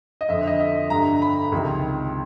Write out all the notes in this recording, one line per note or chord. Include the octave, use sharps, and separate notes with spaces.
D#5
F2 D3 E5
D#5
E5
G2 D3 A#5
B5
C#2 C3 D#3